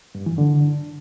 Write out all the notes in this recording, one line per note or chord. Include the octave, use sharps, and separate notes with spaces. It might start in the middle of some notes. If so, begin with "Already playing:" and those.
G2
E3
D3